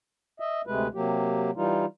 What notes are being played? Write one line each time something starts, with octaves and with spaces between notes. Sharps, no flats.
D#5 E5
D2 C3 G#3 A3 B4
C3 F#3 A#3 G4
E3 G3 D#4 F4